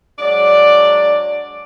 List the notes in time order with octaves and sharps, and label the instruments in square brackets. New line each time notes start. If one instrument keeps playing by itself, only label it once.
[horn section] F#3 G#3 D4 D5